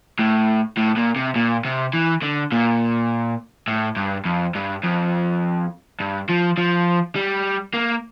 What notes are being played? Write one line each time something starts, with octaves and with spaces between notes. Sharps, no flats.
A2
A2
A#2
C3
A#2
C3
E3
D3
A#2
A2
G2
F2
G2
F2
G2
F3
F3
G3
A#3